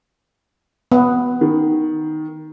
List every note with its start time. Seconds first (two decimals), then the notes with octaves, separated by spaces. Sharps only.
0.92 B3
1.41 D#3